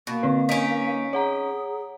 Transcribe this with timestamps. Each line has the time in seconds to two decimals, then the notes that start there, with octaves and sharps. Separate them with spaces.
0.07 B2 A#3
0.23 D3 C4 B4
0.49 C#4 D#4 B6 D7
1.13 G#4 C#5 F#5 A#5